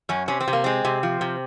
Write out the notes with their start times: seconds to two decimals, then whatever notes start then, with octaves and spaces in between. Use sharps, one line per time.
0.09 F#2 C#4
0.28 C3 C#4
0.40 C4
0.48 C3
0.53 A#3
0.64 G#3 C4
0.85 C3
1.03 F3
1.21 C3